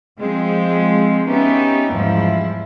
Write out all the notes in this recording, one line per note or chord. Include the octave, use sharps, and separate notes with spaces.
F3 G#3 C4
B3 C#4 D#4 G4 B4 E5
E2 G#2 F3 G3 E4